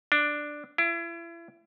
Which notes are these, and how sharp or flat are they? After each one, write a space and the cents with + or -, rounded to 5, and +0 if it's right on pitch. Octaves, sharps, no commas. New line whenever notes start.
D4 +5
E4 +35